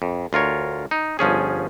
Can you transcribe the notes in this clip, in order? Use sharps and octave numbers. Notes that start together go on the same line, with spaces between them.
F2
D2 F4 A#4 C#5
D#4
G1 F3 C#4 G#4